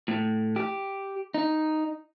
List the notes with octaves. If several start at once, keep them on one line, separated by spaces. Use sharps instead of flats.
A2
G4
D#4